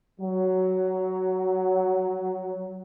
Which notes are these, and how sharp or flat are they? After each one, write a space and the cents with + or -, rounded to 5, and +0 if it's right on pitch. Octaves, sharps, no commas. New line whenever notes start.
F#3 +10